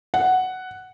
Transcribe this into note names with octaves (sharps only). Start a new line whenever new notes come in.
F#5